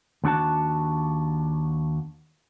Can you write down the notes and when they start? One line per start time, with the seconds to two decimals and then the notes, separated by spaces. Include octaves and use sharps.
0.24 D#2 D4 F#4 A5